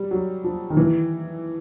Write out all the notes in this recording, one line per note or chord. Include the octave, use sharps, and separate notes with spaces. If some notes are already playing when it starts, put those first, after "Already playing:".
Already playing: G3
F#3
F3
D#3
E3